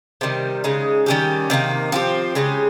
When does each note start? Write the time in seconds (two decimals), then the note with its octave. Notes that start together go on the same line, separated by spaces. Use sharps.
0.21 C3 D#3 G3
0.64 C#3 G#3 D#4
1.06 D#3 G3 C#4 G4
1.50 C3 D#3 A#3
1.92 F3 C4 G4
2.35 C#3 G#3 D#4 G4